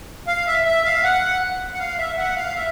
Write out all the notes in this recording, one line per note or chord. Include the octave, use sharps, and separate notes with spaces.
F5
E5
E5
F5
F#5
F#5
F5
E5
F#5
F5
E5